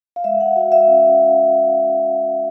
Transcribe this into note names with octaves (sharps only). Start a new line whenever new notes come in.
F5
G#3 E5
F#5
F#4 F5
E5
C#4